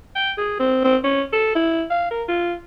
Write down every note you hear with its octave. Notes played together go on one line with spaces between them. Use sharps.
G5
G#4
C4
C4
C#4
A4
E4
F5
A#4
F4